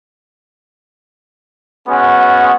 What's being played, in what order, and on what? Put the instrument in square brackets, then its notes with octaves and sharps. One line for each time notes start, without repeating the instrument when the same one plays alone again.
[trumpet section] G#3 B3 C#4 F#4